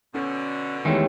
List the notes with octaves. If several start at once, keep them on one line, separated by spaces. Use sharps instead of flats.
B2 D3 C#4
E2 D#3 E3 G#3 A3 G4 C#5 G5